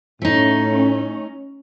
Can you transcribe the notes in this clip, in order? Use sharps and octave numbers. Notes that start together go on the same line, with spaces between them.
A2 A3 C#4 D#4